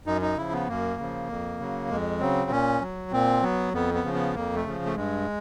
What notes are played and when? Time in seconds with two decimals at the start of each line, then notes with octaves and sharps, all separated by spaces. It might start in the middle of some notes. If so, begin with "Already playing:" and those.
0.06 F#2 D#4
0.22 D#4
0.37 C#3 F3 E4
0.52 B3
0.67 F#2 A#3
0.98 C#3 F3
1.29 F2
1.59 C#3 F#3
1.90 F2 G#3
2.20 C#3 F#3 C4
2.51 A#2 C#4
2.82 F#3
3.12 A#2 C4
3.42 F#3 B3
3.73 F2 B3
3.94 B3
4.04 C#3 F3
4.14 B3
4.34 F2 A#3
4.55 A3
4.65 C#3 F3
4.86 A3
4.96 G2 G#3